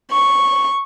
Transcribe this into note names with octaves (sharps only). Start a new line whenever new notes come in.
C#6